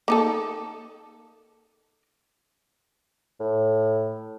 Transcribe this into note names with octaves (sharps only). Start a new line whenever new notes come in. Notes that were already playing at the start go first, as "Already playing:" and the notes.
A#3 D#4 A4
A2